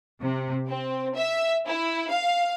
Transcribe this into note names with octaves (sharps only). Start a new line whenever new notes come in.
C3
C4
E5
E4
F5